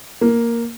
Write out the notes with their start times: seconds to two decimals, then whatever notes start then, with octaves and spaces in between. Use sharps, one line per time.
0.21 A#3